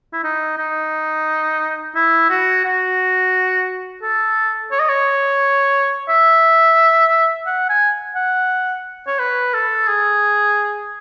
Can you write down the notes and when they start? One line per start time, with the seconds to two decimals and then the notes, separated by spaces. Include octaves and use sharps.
0.13 E4
0.23 D#4
0.58 D#4
1.95 E4
2.30 F#4
2.64 F#4
4.02 A4
4.71 C#5
4.80 D#5
4.89 C#5
6.09 E5
7.46 F#5
7.69 G#5
8.15 F#5
9.07 C#5
9.19 B4
9.54 A4
9.88 G#4